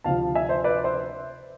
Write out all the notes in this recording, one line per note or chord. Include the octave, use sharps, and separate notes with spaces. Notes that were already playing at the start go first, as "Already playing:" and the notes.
D2 C3 F3 F5 A5
E5 G#5
C5 E5
B4 D5
C5 E5